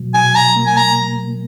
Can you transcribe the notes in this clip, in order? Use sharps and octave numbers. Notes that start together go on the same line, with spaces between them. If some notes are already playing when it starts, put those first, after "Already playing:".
Already playing: B2 F#3
B2 G#5
A#5
A#3
G#5
A#5